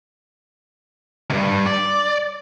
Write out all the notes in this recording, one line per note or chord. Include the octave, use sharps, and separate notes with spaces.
D2 G2
D5